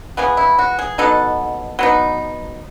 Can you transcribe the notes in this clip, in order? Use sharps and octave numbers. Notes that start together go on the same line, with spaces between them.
C#3 E3 B3 G#4
E4
F#4
G#4
B2 F#3 B3 D#4 A4
F#3 B3 D#4